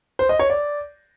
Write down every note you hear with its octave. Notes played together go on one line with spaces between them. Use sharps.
C5
D#5
C#5
D5